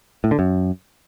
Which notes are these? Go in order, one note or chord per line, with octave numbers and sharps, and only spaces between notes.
A2
D3
F#2